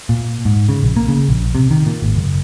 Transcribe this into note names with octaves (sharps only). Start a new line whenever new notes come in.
A#2
G#2
C#3
A#1
A#3
C#3
A#1
C3
D#3
A#2
G#1
F#1